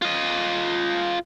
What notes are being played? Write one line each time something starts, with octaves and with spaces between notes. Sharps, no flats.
F4 D#5